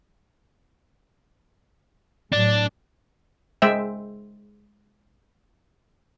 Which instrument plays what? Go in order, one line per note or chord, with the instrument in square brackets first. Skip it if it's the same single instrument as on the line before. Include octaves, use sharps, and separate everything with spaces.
[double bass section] A2 F#3 [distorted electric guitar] D4
[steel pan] G#3 C5 E5 G5